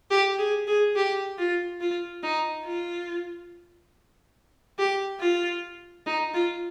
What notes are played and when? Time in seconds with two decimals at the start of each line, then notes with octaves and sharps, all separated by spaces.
0.11 G4
0.39 G#4
0.68 G#4
0.96 G4
1.38 F4
1.81 F4
2.23 D#4
2.65 F4
4.79 G4
5.21 F4
6.06 D#4
6.34 F4